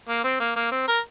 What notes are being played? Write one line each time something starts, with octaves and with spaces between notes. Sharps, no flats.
A#3
C4
A#3
A#3
C4
A#4